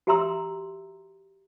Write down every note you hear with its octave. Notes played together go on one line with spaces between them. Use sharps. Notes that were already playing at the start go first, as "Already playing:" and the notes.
F#4 G4 E5 A#5 C6 E6